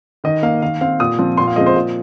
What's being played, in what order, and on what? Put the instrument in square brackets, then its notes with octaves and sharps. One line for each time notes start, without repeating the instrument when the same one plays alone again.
[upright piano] D#3 D#5
A#3 F5
D#3 F5
C4 F5
A#2 D#6
F3 C4
A#2 C6
F5
F3 G#3 C4 D#5
C5
A#2